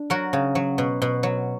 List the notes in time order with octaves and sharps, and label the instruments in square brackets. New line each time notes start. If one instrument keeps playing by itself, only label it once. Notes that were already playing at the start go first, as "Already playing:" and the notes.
Already playing: [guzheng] D4
F#3 F#4 A#4
C#3
F#3
B2
B2
F#3